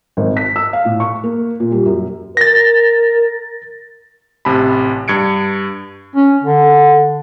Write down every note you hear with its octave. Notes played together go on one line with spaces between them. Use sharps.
G#1
B6
E6
F5
A2
C#6
A#3
A#2
G3
F#2
A#4 A6 A#6
A1 C3 A5 B5
G2 G#6 C#7 D7
C#4
D3